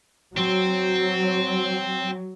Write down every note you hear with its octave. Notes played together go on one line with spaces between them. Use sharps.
F#3 C4